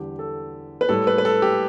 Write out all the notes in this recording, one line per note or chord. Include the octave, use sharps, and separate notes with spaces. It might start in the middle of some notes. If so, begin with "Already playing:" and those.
Already playing: E2 D3 G3 G4
A4
B4
A2 G3 A4
B4
B4
A4
G4